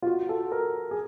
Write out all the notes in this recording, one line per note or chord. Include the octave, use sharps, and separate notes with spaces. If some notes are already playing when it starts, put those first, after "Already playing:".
F4
F#4
A4
A#4
G#4